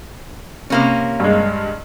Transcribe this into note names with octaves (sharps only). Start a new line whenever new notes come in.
C3 A#3 C#4
G2 G#3